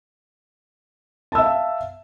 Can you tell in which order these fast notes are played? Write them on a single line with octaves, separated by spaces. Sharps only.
A5 E6 E5 F5